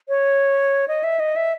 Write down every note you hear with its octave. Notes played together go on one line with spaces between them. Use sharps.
C#5
D#5
E5
D#5
E5